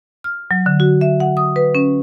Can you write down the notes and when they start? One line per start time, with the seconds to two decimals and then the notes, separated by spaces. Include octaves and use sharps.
0.24 F6
0.51 F#3
0.66 D3
0.80 F#4
1.01 E5
1.20 F#5
1.37 D#6
1.56 B4
1.75 C#4